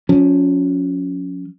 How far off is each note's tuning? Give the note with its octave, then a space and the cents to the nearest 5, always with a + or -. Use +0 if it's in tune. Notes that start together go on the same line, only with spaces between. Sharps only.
F3 +45 C#4 +15